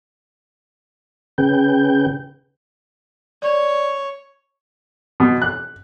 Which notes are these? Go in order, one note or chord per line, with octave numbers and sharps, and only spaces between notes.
C#3 C#4 G#4 B4 G5 G6
C#5 D5
B2
F#6